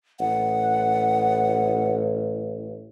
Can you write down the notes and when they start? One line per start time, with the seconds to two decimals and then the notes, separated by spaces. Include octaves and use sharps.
0.20 A1 F#5